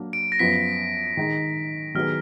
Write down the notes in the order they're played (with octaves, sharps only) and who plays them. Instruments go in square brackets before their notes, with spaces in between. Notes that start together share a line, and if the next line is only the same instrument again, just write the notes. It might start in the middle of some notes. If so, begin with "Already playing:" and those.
Already playing: [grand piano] F#3 A#3 D4
[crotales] D7
A#6
[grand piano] F#2 F3 B3 F4 [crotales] B6
[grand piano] D#3 G#3 D#4
[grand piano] D#3 F#3 B3 D#4 G#4 [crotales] F6